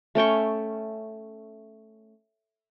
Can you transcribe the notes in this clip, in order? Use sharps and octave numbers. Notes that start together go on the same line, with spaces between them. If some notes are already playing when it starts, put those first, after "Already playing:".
A3 C#4 G5 C#6